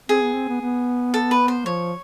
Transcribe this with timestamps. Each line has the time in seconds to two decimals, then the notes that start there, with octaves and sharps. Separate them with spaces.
0.09 C4 G#4
0.22 B3
0.35 C4
0.49 B3
0.61 B3
1.14 A4
1.31 B4
1.48 C5
1.66 F3 C#5